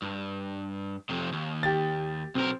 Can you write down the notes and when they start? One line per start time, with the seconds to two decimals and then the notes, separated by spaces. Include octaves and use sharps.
0.02 G2
1.09 F2 C3
1.33 D#2
1.63 G4 A6
2.35 B1 C4 A#4